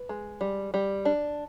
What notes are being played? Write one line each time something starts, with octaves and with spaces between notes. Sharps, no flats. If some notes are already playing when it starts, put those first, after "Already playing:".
Already playing: B4
G#3
G3
G3
D4